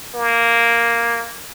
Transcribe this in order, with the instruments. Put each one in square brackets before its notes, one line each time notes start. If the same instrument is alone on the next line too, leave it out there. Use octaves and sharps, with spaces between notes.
[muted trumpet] A#3